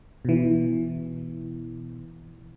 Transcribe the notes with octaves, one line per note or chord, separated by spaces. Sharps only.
B2 E3